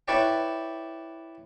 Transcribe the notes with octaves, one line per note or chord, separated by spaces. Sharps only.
E4 B4 C#5 D5 G5